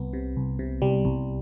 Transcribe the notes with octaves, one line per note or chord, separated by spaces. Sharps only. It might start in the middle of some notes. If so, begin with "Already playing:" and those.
Already playing: C2 B3
C3
C2
C3
C2 G3
C2